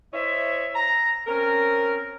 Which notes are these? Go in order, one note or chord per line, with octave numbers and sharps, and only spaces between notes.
E4 C5 C#5 D#5 E5
A#5
C4 C#4 A#4